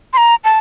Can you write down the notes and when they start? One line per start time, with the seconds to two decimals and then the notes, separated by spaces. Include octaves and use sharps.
0.13 C6
0.17 A#5
0.44 A5